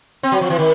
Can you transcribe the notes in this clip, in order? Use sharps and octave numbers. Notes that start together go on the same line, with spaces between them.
C4
F#3
F3
E3
D#3